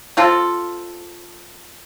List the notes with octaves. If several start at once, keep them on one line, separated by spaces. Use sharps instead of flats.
C4 F4 A4